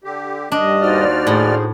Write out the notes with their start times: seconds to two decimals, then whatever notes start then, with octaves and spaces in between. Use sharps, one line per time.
0.04 D3 G4
0.52 G2 D#3 D4 D#5
0.82 D#2 D#4 F#4 C5 D5 F6
1.27 A2 G#4